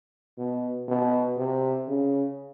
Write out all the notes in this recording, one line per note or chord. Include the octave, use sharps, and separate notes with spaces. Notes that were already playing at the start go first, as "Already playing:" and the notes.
B2
B2
C3
C#3